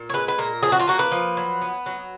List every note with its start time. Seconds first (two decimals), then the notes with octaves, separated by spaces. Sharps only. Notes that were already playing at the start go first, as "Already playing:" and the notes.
Already playing: A#2
0.09 C#5
0.13 G#3 B4
0.28 B4
0.38 A#2 A#4
0.63 F3 G#4
0.72 F#4
0.80 F4
0.87 A#3 F#4
0.99 B4
1.11 F3
1.37 F#3
1.61 B3
1.86 F#3